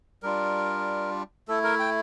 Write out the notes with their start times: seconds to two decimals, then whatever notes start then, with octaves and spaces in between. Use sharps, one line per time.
0.22 G3 D4 F4 A#4
1.48 A3 E4 A4
1.64 A#4
1.79 G5